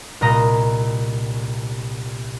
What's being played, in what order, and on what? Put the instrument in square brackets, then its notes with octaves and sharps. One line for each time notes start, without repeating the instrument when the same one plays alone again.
[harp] C2 A#2 D#5 A#5 A#6